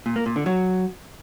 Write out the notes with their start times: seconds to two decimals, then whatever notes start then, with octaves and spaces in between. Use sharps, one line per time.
0.06 A#2
0.16 A#3
0.26 A#2
0.36 D3
0.46 F#3